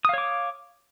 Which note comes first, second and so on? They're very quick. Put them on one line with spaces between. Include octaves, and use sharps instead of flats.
D#6 F5 C#5 D6